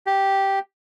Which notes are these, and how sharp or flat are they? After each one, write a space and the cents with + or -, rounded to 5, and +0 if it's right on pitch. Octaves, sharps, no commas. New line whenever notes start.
G4 -5